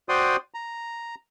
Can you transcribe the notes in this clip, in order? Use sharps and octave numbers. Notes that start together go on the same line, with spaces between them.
F#4 C5 D5 G5 C6 D#6
A#5